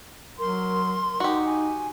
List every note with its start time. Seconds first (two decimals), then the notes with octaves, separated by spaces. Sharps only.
0.39 F#3 A#4 C6
1.20 D#4 F#4 G4
1.46 G#5